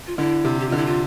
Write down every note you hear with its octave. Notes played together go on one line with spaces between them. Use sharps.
F4
D3 E4
C3
G4
D3 F4
E4
F4